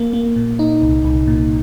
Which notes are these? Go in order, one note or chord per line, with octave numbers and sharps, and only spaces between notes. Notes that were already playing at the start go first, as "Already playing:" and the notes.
Already playing: A#3
A#3
A#2
D#4
C2
C2
A#2